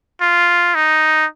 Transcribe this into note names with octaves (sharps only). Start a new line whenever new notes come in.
F4
D#4